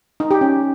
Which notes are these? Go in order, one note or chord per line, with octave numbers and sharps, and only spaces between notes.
D#4
G4
C#4